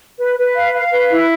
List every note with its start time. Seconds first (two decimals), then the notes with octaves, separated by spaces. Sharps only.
0.19 B4
0.38 B4
0.56 F5
0.74 F5
0.91 B4
1.09 E4